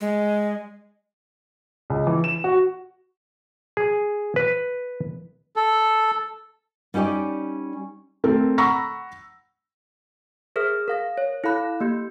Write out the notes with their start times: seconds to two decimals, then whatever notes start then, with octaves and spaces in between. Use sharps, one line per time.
0.01 G#3
1.90 C#2
2.07 E3
2.24 E7
2.44 F#4
3.77 G#4
4.36 B4
5.56 A4
6.94 G3 C#4 D#4 G4 D5
8.24 A3 C4 A4 A#4
8.58 F#5 A#5 B5 C#6 E6 A#6
10.56 G#4 A#4 C5 E5 F6
10.88 A#4 F5 A#6
11.18 C#5
11.44 E4 A4 F5 B5 F#6
11.80 A#3 G4 G6